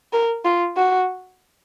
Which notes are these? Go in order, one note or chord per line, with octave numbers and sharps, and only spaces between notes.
A#4
F4
F#4